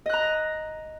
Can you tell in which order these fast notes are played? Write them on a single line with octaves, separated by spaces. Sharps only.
D#5 F#6 A#5